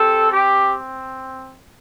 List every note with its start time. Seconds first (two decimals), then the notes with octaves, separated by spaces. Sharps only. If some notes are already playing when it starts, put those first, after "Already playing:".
Already playing: C4 G4 A4
0.32 G4